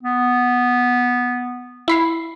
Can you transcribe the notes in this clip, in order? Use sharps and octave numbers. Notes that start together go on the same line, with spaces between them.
B3
E4 B5 C7